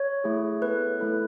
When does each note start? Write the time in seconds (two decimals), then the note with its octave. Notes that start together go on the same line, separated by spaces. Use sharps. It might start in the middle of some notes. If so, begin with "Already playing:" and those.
Already playing: C#5
0.24 A3 E4 G#4
0.62 B3 E4 A4 B4
1.00 A3 E4 A4